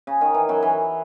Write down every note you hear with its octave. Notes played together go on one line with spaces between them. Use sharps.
C#3
D#3
E3
F#2 F#3
E3